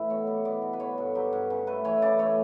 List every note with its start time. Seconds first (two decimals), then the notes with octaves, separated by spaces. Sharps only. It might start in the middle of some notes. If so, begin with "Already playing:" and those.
Already playing: A2 E3 E4
0.10 B2 C#5
0.27 G3
0.45 B3 D5
0.62 B2
0.73 B4
0.80 D3 C#5
0.98 G2
1.15 F#3 G4
1.33 G2
1.50 C#3
1.67 A3 B4
1.85 E3 C#5
2.02 C#3 D5
2.19 A3 C#5